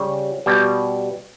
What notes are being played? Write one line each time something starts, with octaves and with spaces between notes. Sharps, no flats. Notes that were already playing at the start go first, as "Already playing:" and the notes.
Already playing: C#3 G3 C#5
B2 G3